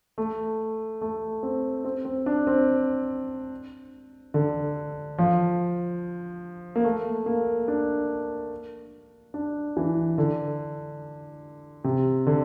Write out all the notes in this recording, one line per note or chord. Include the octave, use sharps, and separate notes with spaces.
A3
A3
C4
C4
C4
D4
C4
D3
F3
A#3
A3
A#3
D4
D4
E3
D3
C3
D3